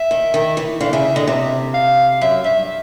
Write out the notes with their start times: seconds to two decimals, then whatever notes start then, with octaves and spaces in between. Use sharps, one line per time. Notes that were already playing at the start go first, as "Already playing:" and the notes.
Already playing: E5
0.11 D#3
0.34 D#3
0.57 E3
0.81 D3 F5
0.93 C#3 E5
1.04 E5
1.16 D3 D#5
1.28 C3 E5
1.74 F5
2.21 F#2 E5
2.44 G2 E5